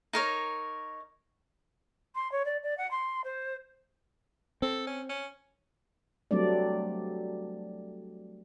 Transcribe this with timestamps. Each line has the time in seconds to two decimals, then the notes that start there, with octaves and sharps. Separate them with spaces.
0.13 D#4 A#4 C#5
2.15 C6
2.32 C#5
2.45 D5
2.63 D5
2.77 F#5
2.91 C6
3.24 C5
4.62 C4 A4
4.87 C#4
5.09 C#4
6.31 F#3 G3 A3 C4 D4 D5